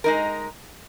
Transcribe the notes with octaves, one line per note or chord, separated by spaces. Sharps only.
G#3 D#4 A#4